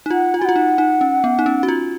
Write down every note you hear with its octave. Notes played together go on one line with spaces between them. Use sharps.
D#4
F4 F#5
F4 G#5
F#4
F4 F#5
D#4
D#4
C#4
B3
D#4
C#4
F#4
F4